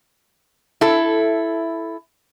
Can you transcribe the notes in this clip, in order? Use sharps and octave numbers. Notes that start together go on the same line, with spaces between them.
E4 A4